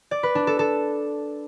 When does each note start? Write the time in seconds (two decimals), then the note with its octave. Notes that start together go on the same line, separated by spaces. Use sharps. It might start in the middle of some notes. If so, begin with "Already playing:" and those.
0.11 D5
0.23 B4
0.35 D4
0.47 A4
0.59 A4